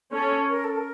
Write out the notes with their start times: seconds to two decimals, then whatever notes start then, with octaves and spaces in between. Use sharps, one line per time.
0.12 C#4 A4
0.49 A#4
0.64 A4
0.78 A#4